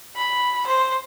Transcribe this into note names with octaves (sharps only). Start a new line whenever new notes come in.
B5
C5